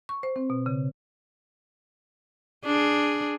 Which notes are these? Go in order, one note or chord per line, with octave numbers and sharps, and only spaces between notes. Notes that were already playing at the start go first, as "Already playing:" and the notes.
C#6
C5
C4
B2
C#3
D4 G#4